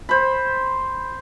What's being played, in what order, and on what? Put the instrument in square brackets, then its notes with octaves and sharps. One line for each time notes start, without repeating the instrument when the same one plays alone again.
[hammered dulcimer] C5 B5